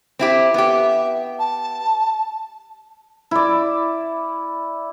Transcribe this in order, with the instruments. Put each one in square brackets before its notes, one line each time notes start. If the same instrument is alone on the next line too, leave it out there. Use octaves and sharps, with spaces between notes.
[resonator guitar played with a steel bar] C4 E4 G4
[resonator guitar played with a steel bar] B3 G4 [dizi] E5
[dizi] A5
[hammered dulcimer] E4 D5